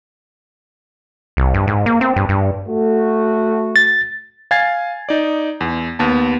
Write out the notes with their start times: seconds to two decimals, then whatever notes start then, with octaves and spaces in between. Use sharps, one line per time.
1.37 C2
1.54 G2
1.67 G#2
1.86 A#3
2.01 C4
2.16 G2
2.29 G2
2.69 A3 F#4
3.76 A6
4.51 F5 G#5 G#6 A6 C7
5.09 D#4 D5
5.61 E2
5.99 D#2 B3 A5